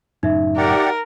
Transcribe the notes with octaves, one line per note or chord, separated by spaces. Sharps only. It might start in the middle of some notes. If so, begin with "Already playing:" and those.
F#2 A2 C#3 D#4 E5
G4 A#4 D5 F#5